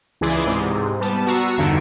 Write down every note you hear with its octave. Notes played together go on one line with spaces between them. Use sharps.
C#2 E3 E4 G#4 D5 C6
G#2 C3
G3 B3 A5
B3 F#4 A#5 C#6 E6 C7
E2 G2 D3 D#3 D7